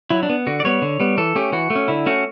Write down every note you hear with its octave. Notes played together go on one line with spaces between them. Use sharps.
F#3 E4
D4
B3
D3 F#4
D5
G3 B3 C#5
D3
G3 B3
E3 A4
A3 C#4 G4
E3 F#4
A3
C#4
D3 E4
A3 C#4 F#4